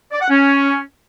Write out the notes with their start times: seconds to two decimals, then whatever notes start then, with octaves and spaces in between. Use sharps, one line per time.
0.12 D5
0.21 F#5
0.30 C#4